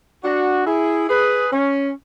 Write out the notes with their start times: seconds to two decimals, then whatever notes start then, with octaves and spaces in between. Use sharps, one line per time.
0.24 D4 F#4
0.66 E4 G#4
1.09 G#4 B4
1.52 C#4